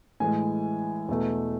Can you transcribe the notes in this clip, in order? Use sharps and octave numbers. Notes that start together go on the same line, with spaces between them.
A2 E3 G#3 G#5
E2 B2 A3